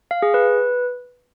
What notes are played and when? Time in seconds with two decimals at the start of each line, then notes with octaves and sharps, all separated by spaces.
0.11 F5
0.22 G#4
0.34 B4